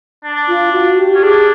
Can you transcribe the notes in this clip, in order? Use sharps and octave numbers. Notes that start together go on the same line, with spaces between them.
D4
F4
F#4
G4
C#4
D4 G#4